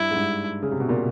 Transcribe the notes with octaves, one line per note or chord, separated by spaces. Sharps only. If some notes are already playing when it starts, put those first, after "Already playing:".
Already playing: G2 E4
G#2
G2
C#3
C3
B2
A#2